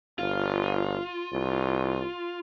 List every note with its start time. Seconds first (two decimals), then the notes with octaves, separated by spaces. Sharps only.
0.19 G1 F4
1.32 C2